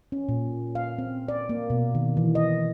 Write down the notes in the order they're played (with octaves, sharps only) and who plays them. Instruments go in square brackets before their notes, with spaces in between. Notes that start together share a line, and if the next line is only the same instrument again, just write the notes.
[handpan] C#4
A#2
F5
C4
D5
A#3
B2
D#3
E3
D#5